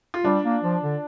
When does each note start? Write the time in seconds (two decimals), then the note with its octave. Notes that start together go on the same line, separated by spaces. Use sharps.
0.14 F4
0.25 G3 D4
0.44 A#3
0.63 F3
0.83 D3